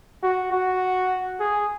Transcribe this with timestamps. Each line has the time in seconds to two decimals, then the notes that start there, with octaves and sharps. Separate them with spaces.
0.23 F#4
0.52 F#4
1.40 G#4